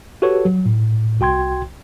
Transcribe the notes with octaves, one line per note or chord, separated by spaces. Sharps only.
F#4 G4 A4 B4 C#5
F#3
A2
C2 F#4 G5 C6 G#6